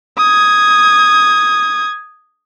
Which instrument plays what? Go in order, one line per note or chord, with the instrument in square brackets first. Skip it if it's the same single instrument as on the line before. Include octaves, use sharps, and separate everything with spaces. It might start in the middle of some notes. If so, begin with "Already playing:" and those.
[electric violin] D#6 G#6